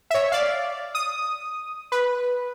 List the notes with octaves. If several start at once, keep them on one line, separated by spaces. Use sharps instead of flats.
C#5 E5
D5 F5
D#6
B4